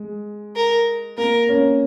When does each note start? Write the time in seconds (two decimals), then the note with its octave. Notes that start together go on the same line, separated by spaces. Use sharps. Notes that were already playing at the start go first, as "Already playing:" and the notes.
Already playing: G#3
0.56 A#4
1.18 A#3 A#4
1.49 A#3 C#4